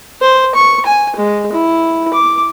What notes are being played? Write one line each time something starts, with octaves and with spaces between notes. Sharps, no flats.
C5
C#6
G#5
G#3
E4
D6